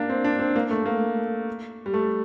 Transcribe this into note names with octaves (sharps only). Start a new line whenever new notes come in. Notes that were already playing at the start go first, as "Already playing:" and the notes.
Already playing: A#3 D4
C4
D4
C4
A#3
A3
A#3
G3
A3